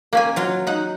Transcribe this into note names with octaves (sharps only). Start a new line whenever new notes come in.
A#3 C#4 G#5
F#3 F4
D#4 F#5